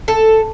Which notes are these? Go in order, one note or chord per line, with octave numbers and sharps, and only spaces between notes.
A4